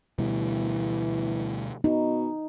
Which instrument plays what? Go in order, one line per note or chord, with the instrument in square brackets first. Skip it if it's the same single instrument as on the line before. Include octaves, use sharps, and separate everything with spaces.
[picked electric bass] D2 B2 G3 [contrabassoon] E3
[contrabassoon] B2 [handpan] D#4